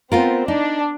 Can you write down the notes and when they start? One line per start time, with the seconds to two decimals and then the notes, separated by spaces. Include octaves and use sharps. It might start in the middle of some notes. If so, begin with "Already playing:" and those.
0.12 B3 C4 F4 A#4
0.48 D4 D#4